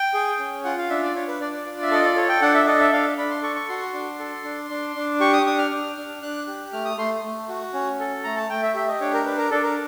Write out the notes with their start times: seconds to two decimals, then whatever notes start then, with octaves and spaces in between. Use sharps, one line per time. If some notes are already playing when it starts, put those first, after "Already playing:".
Already playing: G5
0.14 G#4
0.39 C#4
0.64 F4 F#5
0.78 F5
0.90 D4 E5
1.03 D5
1.16 D4 C#5
1.28 B4
1.41 D4 D5
1.53 D5
1.66 F4
1.82 E5
1.91 A4 D#5
2.05 D5
2.16 A4 C#5
2.29 G5
2.42 D4 F#5
2.54 E5
2.67 A4 D#5
2.80 E5
2.93 D4 F5
3.17 D4 B5
3.31 C6
3.43 A4 C#6
3.56 C#6
3.69 F#4 C6
3.93 D4
4.20 A4
4.44 D4
4.70 D4
4.95 D4
5.20 G4 C#6
5.33 D#6
5.46 D4 D#6
5.58 F6
5.71 D4
5.97 D4
6.22 D4 F#6
6.47 G4
6.73 A3 F6
6.85 D#6
6.97 A3 C6
7.24 A3
7.49 F#4
7.74 C#4
8.00 A4
8.24 A3 A#5
8.37 A5
8.50 A3 G5
8.63 E5
8.75 G4 E5
8.88 D#5
9.00 D4 C#5
9.14 A#4
9.25 D4 B4
9.38 A#4
9.51 D4 A4
9.64 A#4